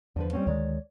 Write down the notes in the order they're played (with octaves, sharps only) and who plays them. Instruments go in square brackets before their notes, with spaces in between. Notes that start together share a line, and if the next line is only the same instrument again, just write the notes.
[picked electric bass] E2 [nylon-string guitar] D3 F3 B4
[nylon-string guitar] G3 C4 C#4
[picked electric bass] D2 D#3 G#3 [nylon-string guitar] C#5 D5